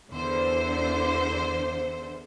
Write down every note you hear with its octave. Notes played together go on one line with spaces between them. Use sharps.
E2 D3 C5